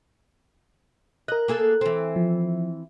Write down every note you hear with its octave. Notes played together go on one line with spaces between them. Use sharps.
A#4 D#5 F#6
A#3 G#4 A4
E3 C4
F3